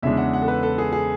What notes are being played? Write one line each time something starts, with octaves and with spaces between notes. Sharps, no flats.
E2 C#3 G#3 D4 E5
F#5
F#5
A4
B4
A4
G#4
G#4